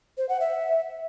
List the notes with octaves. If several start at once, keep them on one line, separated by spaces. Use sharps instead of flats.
C5
F#5
E5